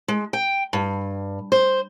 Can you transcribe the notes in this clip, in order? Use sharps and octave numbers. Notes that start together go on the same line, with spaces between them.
G#3
G5
G2
C5